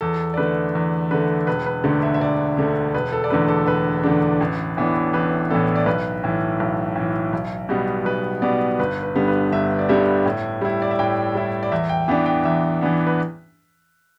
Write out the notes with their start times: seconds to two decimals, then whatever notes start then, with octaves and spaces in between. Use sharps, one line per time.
0.01 E2 A4
0.34 D5
0.37 D3 A3 B4
0.75 E2
1.11 D3 A3 B4
1.47 E1 B4
1.66 B4
1.84 D2 D3 A3 D5
2.03 E5
2.14 E5
2.20 E1 D5
2.57 D2 D3 A3
2.94 E1 B4
3.13 A4
3.24 D5
3.30 E2 D3 A3 D4 B4
3.48 A4
3.67 E1 B4
4.03 E2 D3 A3 D4
4.41 A1
4.77 A2 E3 B3 D4
5.13 A1 B4
5.50 A2 E3 B3 D4 A4
5.76 D5
5.86 B1 B4
6.24 A2 E3
6.60 B1
6.96 A2 E3
7.33 B1
7.69 B2 G3 B3
8.05 B1 B4
8.42 B2 G3 B3 D5
8.79 G1 B4
9.03 B4
9.15 G2 D3 G3 B3
9.28 B4
9.52 G1 E5
9.79 D5
9.89 G2 D3 G3 B3 E5
10.25 A2
10.61 G3 E4
10.82 D5
10.91 E5
10.99 A2 G5
11.34 G3 E4
11.63 D5
11.72 E2 E5
11.89 G5
12.08 E3 B3 D4 G5
12.26 G5
12.45 E2 E5
12.81 E3 B3 D4
13.07 B4